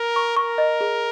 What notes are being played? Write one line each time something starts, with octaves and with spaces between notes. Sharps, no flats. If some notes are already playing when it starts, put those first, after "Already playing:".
Already playing: A#4
C#6
A#4 C#6
D#5
G#4